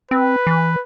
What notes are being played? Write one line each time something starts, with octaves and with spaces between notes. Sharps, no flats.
C4 B4
E3